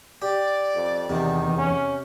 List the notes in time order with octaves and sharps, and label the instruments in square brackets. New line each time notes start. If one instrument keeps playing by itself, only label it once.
[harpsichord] G4 [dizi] D5
[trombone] F2
[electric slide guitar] E2 [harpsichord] C3 [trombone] D#3
[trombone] C#4